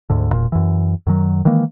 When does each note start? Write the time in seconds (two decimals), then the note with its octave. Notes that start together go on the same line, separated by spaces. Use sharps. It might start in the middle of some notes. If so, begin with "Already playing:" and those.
0.10 D2 G#2 D3
0.31 E1 A#2
0.52 F#2 E3
1.07 F#2 D#3 F#3
1.45 D#3 E3 G#3 A#3